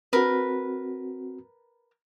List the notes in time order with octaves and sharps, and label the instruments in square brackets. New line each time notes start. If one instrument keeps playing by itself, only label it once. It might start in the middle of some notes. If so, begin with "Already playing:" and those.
[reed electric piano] C4 F#4 [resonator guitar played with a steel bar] A#4 B4